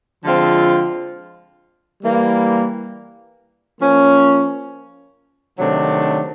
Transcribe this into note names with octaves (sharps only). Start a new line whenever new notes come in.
D3 F3 G#3 C4 F4
E3 G3 A#3
F3 A#3 C#4
C3 D#3 F#3 A3 D4